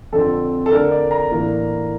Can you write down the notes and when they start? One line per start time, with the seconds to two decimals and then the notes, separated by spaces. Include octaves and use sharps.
0.12 F2 D3 F3 C4 A4
0.66 A4
0.71 D3 A3 D4 A#4
0.91 D5
1.11 A#5
1.31 A2 E3 A#3 D4